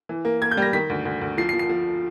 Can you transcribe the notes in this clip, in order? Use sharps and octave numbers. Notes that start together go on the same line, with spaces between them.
E3
A#3
A#3 G#6
G6
G3 A#6
D#3 B6
D2
D2
D2
F3 C7
C7
F3
C7
F3